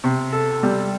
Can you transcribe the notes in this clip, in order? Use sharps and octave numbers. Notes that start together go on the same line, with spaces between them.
C3
A4
G3